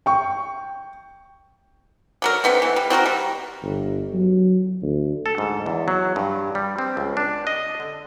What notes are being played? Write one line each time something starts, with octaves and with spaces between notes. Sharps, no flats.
G5 C#6
D3 F#3 A#4
D3 A3 B3 C4
E3
G3
C4 F#4 A4 A#4
G3
G1
F#3
D2
A4
G#2
E2
F#3
G2
G3
C4
C#2
D4
D#5
D3